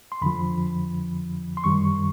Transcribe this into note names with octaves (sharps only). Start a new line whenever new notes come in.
C6
F2 D3 F3 B5
C6
F#2 D#3 G3 C#6